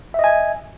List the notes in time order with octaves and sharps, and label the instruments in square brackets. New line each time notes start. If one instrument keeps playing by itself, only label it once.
[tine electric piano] E5
D#5
G#5